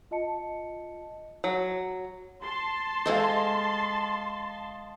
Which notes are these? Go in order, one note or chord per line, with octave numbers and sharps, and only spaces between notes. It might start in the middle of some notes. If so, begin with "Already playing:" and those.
F4 D#5 A5 C#7
F#3
A5 C6
G#3 A4 C5 D#5 F5